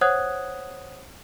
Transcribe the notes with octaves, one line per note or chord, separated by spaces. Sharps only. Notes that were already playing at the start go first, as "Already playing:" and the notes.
C5 C#5 F#5 D#6 F#6 G#6